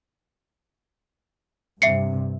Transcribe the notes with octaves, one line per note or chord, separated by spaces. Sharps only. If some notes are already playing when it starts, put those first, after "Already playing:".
G2 C3 E5 C7 C#7